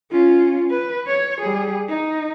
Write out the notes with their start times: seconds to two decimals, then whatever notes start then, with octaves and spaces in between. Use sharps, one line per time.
0.12 C#4 F4
0.71 B4
1.07 C#5
1.41 G3 G#4
1.89 D#4